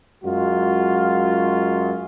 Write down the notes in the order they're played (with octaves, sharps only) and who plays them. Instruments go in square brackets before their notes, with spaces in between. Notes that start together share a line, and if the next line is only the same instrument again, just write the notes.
[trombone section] F#2 G#3 F4 F#4